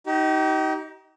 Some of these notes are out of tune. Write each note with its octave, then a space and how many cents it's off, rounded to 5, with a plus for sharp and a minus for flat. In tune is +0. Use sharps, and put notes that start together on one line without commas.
D#4 +15 G4 -35